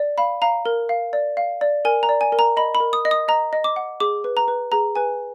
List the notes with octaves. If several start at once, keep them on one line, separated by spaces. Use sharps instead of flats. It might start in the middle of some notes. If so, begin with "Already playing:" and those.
Already playing: D5
F5 B5
F5 A#5
A#4
F5
D5
F5
D5
A#4 G#5
A#5
D5
G#5
A#4
A#5
D#5 B5
B5
A#4
D#6
D#5
D#6
D#5 A#5
D#5
D6
F#5
G#4 D6
B4
A#5
B4
G#4 A#5
B4 G#5